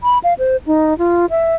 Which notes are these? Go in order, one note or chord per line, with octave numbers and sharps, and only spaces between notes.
B5
F5
C5
D#4
F4
E5